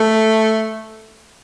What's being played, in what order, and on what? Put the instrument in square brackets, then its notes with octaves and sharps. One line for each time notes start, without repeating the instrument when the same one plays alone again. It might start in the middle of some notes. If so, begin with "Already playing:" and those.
Already playing: [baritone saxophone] A3